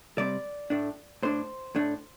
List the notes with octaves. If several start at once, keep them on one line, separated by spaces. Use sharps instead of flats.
C3 G3 C4 D5
A2 A3 D4
A2 A3 D4 C5
A2 A3 D4